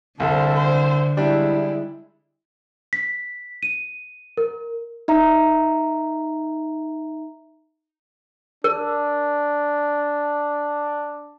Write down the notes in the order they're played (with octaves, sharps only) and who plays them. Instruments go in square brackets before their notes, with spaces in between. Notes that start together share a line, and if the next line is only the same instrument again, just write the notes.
[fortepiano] C2 [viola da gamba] D3 [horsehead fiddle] A4 C5
[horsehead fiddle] C5
[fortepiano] G3 D4 [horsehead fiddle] G#3 E4
[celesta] B6
D#7
A#4
[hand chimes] D#4 E5 A#5
[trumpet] D4 [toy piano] A#4